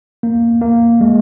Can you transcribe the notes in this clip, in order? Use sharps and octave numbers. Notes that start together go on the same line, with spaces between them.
A#3
A#3
G#3